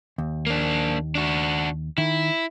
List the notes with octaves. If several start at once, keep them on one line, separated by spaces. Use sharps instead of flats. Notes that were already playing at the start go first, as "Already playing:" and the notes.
D#2
A#3 D4
D4 F#4
D#3 E4